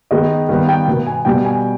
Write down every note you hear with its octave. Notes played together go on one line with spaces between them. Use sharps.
D#3 G#3 B3 D#5
D#3 G3 B3 F5
G5
B2 B3
G#5
B2 G3 B3 G5
G#5